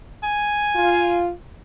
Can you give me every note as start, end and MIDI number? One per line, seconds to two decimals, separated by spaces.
0.24 1.24 80
0.74 1.30 65